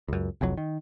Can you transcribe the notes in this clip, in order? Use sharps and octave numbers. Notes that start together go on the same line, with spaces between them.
C#2 F#2
F1 C2 F2 F#3
D#3